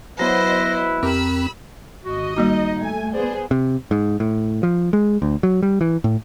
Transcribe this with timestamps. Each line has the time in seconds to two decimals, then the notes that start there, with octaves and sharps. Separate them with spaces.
0.19 F#3 B3 E4 B4 C5 D#5 A#6
1.03 F2 C4 G4 A#4 B5 E6
2.05 G#1 F#4 D#5
2.36 G3 A#3 D#4 F#4
2.79 A3 G#5
3.13 B3 G#4 C5 D5
3.51 C3
3.91 G#2
4.20 A2
4.63 F3
4.93 G#3
5.22 D2
5.43 F#3
5.62 G3
5.81 E3
6.04 A2